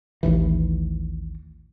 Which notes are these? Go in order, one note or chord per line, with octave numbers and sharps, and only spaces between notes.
A1 D#2 E3